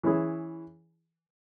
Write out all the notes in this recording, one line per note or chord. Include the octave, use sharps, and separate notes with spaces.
E3 C#4 E4 G#4